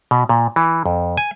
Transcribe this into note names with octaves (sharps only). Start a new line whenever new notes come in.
B2
A#2
E3
F2
G#5